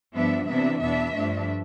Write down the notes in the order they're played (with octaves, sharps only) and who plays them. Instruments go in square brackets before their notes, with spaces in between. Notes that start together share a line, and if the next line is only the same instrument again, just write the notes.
[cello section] G2 F3 B3 D4 E5
C3 E3 B3 D4 E5
E2 B2 B3 D4 E5
G2 F3 A3 D4